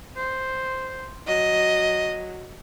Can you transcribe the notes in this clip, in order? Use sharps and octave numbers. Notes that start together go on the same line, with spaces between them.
C5
F#3 D#5